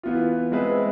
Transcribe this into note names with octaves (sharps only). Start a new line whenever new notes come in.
E3 B3 F4
G#3 C4 G#4 B4 E5